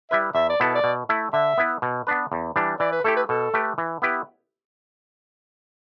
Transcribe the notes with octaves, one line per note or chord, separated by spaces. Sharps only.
G3 E4 B4 E5
E2 E5
D5
B2 B3 E4 A4 B4
D5
B2
A3 E4
D3 E5
B3 E4 B4
B2
B3 D4 B4
E2
E3 G3 D4
E3 D5
B4
A3 E4 G4 A4
B4
B2 A4
A3 G4 B4
E3
B3 E4 G4 B4